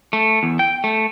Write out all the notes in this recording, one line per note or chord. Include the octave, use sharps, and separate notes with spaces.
A3
E2
G5
A3